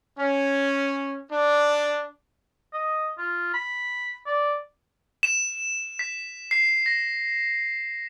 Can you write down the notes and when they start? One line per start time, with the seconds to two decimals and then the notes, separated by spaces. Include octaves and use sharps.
0.18 C#4
1.30 D4
2.73 D#5
3.18 F4
3.54 B5
4.26 D5
5.23 E7
5.99 B6
6.51 C7
6.86 A#6